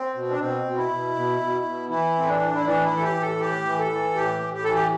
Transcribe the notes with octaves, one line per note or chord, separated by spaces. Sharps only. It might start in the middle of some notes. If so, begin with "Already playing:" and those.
Already playing: C4
B2
D4
B2 C4
B2
E4
B2
B2
B2
B2
E3 E4
A2 C4
D4
A2
E4
E3 D4
E4
E3 A4
G4
A2
A4
A2 G4
E3
A4
E3
A2 G4
A2
G4
E3 A4
G4